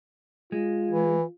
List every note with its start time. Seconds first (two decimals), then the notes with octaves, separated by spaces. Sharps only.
0.52 G#3 F4
0.91 E3